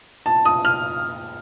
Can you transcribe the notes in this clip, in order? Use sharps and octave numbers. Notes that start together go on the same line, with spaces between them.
A5
D#6
F6